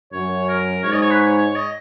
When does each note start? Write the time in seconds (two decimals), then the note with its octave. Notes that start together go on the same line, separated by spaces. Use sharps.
0.13 F#2 C#5
0.49 A#4
0.84 G#2 C#5
0.93 D#5
1.02 C#5
1.11 B4
1.19 C#5
1.38 C#5
1.55 D#5